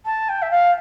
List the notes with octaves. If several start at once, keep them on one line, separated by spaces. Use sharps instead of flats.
A5
G5
E5
F5